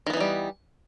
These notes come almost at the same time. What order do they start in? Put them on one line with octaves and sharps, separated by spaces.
D#3 B3 E3 D#4 G3